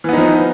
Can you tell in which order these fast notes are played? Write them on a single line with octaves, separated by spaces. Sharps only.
E3 B3 D#4 F3